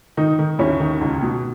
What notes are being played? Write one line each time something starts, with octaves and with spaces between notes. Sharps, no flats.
D#3 D#4
D#3
D#2 C#4 E4
D#3
C#2
B2